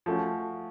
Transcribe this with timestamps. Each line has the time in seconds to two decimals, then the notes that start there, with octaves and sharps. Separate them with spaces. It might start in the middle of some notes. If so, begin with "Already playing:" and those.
0.06 F3 A3 C#4 F#4